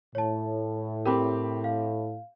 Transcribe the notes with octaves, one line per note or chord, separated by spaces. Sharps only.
A2 C#5 A5
C4 G4 A#4 B5 D6
F5